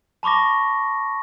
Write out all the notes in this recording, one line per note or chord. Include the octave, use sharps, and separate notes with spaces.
A5 B5 C#6 D6 A#6